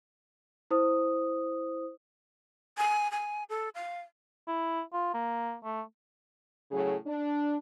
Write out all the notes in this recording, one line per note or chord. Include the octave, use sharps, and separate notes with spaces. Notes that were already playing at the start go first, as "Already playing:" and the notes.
E4 C5 D#6
G#5
G#5
A4
F5
E4
F4
A#3
A3
A2 C#3 F#3 C#4 G#4
D4